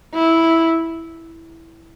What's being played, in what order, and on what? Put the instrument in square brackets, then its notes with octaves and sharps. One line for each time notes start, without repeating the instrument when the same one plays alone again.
[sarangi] E4